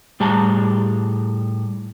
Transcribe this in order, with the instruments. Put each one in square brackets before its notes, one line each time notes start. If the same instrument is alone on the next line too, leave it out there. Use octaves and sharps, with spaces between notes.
[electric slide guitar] A2 G3 G4 G#4 A5 A#5